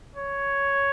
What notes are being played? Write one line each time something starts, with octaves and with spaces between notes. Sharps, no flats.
C#5